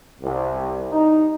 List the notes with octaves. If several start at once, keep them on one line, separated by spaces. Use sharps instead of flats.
C2
D#4